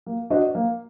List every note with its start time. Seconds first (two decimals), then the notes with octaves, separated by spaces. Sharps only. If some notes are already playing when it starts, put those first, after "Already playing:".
0.06 A#3
0.30 D4 F#4 C5 D#5
0.55 A#3